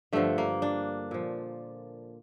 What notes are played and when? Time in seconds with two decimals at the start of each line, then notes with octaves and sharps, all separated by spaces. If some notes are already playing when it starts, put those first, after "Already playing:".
0.13 G2 D3 F3 A3
0.38 A#3
0.62 D4
1.11 A#2 F3